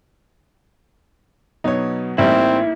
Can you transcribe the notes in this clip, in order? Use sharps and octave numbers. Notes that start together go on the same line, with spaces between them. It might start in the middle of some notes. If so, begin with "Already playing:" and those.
B2 F#3 B3 D#4 C#5
A1 G3 A#3 C4 D#4 E4